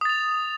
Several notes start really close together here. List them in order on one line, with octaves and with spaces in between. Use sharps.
D#6 A6 F7